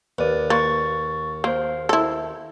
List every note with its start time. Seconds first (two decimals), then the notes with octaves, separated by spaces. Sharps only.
0.19 D#2 B4 D5
0.50 A#3 C#6 A6
1.44 A#3 C5 F5
1.89 E4 A4